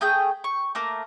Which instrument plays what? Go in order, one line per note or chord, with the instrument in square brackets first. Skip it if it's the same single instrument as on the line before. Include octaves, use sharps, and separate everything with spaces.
[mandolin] A3 G#4 G5 G6
C#6
A3 A#3 A#4